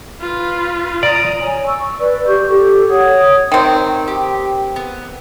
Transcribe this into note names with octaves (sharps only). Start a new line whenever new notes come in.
F4 B4
D5 A#5 D#6
C#5 G#5
C#6 E6
B4 D5
G4 C#6 G6
G4 A4
C#5 F#5 D#6 G#6
D#3 C4
G4
B3